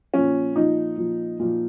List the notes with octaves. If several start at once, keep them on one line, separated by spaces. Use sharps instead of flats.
A#2 F3 C#4
A#2 F3 D#4
A#2 F3
A#2 F3